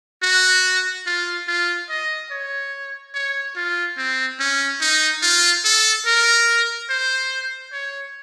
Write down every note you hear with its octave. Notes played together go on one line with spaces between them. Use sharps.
F#4
F4
F4
D#5
C#5
C#5
F4
C4
C#4
D#4
F4
A4
A#4
C5
C#5